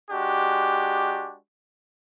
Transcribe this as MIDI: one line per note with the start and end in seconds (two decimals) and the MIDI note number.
0.10 1.36 56
0.10 1.36 62
0.10 1.36 66
0.10 1.36 67